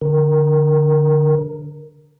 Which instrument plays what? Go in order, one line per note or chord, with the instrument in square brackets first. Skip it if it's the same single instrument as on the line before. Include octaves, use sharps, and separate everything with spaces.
[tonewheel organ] D3 A#4